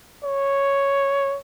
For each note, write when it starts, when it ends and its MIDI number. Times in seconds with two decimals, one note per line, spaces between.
0.24 1.37 73